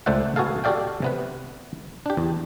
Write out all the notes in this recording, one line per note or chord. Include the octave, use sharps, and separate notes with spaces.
C#2 A3 C5 D5 E5 F#5
B3 F#4 G#4 A4 F5
F#4 G4 A4 D5 F5 G5
C3 B3 B4
D4 G4
E2